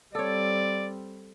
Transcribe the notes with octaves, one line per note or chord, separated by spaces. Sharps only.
G3 C4 A4 C#5 D5